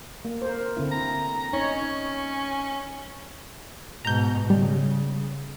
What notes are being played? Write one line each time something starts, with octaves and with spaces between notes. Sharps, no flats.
A#3
A#4 C5
D3 C4 E4
A#5
C#4 D#4 C#5
G#2 B2 A#5 G6
C#3 G3